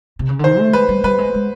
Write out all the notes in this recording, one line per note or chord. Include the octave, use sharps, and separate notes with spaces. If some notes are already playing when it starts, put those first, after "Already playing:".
C3
C#3
D3
D#3 C5
A3
G#3 B4
G3
G3 B4
G#3
G#3